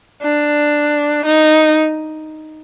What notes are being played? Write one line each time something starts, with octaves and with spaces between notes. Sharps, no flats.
D4
D#4